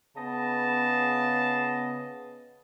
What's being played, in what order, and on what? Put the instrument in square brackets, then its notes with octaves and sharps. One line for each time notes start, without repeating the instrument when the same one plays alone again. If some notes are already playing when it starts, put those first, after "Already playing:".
[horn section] C#3 B3 D#5 A5